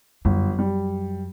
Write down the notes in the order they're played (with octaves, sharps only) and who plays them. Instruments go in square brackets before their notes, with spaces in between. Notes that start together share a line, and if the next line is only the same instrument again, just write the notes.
[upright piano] G1 [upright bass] F#2
[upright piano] G3